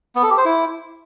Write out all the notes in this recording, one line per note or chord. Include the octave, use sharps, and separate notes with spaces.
B3
A4
G4
C5
E4